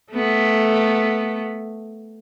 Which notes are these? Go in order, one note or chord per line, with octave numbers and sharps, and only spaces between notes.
A3 B3